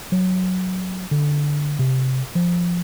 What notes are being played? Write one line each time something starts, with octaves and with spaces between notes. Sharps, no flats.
F#3
D3
C3
F3